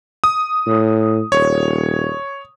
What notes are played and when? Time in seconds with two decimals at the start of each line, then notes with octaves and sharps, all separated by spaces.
0.24 D#6
0.67 A2
1.32 D#1 C#5